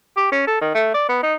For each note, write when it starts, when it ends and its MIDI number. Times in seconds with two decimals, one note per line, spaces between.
0.16 0.28 67
0.32 0.45 61
0.47 0.61 69
0.61 0.73 51
0.75 0.93 57
0.94 1.05 74
1.09 1.19 59
1.23 1.35 63